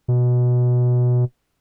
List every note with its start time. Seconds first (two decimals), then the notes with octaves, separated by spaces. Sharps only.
0.08 B2